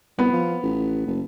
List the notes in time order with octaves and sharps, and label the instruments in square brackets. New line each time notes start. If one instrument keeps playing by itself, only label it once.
[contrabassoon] C2 [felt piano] B3
[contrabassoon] F3
A1
F#1